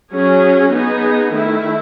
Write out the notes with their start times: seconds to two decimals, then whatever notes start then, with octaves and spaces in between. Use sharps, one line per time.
0.12 F#3 C#4 G#4
0.73 B3 D#4 G#4
1.33 D#3 A3 E4